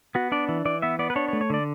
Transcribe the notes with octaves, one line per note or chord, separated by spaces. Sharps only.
B3 F#4
D4 D5
E3
E3 D5
B3 E5
B3 D5
B4
D4 C#5
C#5
A3
C#5
D3 D5